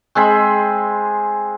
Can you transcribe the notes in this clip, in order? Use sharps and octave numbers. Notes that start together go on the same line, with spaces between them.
G#3 C4 G#4 B5